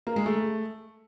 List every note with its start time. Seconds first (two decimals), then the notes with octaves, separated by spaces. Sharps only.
0.07 A#3
0.16 G#3
0.26 A3